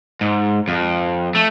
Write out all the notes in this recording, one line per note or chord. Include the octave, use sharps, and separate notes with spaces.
G#2
F2
A3